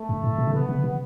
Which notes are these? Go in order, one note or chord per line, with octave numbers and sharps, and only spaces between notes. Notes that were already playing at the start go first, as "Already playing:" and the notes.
Already playing: A3
G2
A2
B2
C#3
C3 B3
C#3
C3